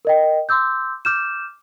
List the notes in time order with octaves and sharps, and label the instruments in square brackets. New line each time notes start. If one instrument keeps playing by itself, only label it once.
[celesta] A#4 D#5 G5
C6 D6 E6 G6
D6 F6 G6 E7